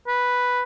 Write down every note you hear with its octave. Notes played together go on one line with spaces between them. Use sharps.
B4